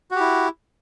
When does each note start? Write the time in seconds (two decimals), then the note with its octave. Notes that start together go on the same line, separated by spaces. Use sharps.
0.11 F#4
0.16 G4
0.20 E4